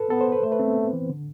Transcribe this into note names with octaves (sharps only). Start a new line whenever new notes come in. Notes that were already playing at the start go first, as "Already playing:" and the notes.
Already playing: A4 B4
B3 A4
C5
B4
A3 C5
B4
C4
B3
E3
D3